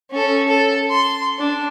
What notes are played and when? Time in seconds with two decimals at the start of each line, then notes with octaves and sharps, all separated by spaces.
0.11 C#4 A4
0.48 A4
0.91 C6
1.39 D4